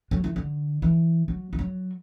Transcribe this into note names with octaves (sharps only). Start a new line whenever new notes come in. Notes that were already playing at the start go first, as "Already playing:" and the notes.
F#3
E3
D3
E3
F#3
E3
F#3